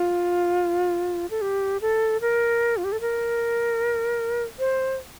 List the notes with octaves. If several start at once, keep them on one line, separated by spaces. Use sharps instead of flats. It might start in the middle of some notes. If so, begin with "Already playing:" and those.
Already playing: F4
A4
G4
A4
A#4
F4
G4
A4
A#4
C5